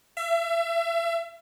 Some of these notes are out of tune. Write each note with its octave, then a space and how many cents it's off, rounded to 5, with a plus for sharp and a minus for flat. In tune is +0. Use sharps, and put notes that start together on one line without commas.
E5 +35